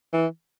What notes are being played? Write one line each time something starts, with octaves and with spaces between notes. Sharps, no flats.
E3